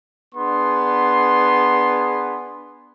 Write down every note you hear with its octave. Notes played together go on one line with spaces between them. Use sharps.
B3 D4 G#4 C6